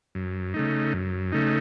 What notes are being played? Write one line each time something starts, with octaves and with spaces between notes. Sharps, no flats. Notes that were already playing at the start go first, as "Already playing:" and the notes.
F#2
C#3 A3 D#4
F#2
C#3 A3 D#4